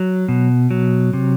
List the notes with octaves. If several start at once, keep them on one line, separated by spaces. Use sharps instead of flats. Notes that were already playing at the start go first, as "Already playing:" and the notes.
Already playing: F#3
B2
F#3
C3